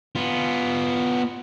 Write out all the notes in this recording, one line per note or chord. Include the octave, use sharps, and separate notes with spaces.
B3 F4